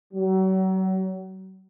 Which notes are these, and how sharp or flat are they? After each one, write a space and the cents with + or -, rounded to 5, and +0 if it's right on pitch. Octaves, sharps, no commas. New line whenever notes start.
F#3 +35